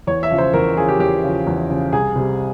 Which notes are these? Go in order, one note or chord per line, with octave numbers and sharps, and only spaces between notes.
E2 C#5
E5
C#3 F3
C5
E2 A#4
C#3 F3 G#4
G4
E2 G4
C#3 F3
E2
C#3 F3
C2 G#4
C3 G3